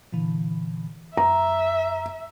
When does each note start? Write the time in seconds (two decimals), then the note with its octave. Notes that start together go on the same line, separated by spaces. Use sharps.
0.12 A#2 D3 E3
1.17 F#2 E5 A#5